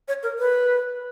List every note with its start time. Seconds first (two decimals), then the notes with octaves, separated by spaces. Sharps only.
0.08 C#5
0.23 A#4
0.39 B4